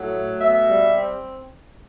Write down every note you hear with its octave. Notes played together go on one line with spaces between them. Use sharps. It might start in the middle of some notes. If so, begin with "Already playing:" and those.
Already playing: A2 F#3
A3
B2 E5
G3
C4